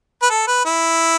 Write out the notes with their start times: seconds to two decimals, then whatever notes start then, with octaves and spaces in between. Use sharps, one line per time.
0.23 B4
0.30 A4
0.47 B4
0.65 E4